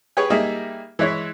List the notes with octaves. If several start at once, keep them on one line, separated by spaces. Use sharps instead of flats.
G4 G#4 B4 C#5 G5 C#6
G3 A#3 D#4 G#4 E5
E3 G#3 E4 C#5 E5